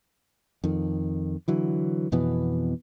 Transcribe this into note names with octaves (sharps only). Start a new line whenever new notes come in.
F2 D#3
D3 E3 F#3
F2 B2 E3 B3